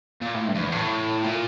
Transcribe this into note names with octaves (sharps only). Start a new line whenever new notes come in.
A#2
A2
G2
F2
E2
A2
A#2